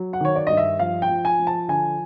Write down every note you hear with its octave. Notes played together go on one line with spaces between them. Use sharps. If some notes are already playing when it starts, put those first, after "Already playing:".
Already playing: F#3
F#5
D#3 C#5
D5
G2 D#5
E5
F3 F5
G5
F3
G#5
F3
A5
D3 G#5